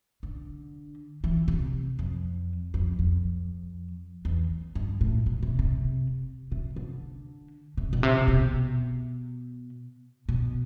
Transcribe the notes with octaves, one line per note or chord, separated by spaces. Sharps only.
D3
E3
C3
F2
F2
F2
E2
G2
A2
B2
C3
C3
C3
D3
C3
B2
C3
B2
B2